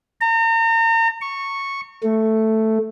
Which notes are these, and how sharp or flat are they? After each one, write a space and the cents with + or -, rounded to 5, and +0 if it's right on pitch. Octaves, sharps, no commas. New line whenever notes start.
A#5 -40
C#6 -5
A3 +0